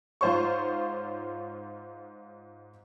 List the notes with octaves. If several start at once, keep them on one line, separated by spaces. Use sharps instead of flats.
G#2 F4 C5 C#5 C#6